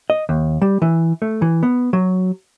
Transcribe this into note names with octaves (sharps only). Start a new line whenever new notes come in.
D#5
D#2
G3
E3
A3
E3
B3
F#3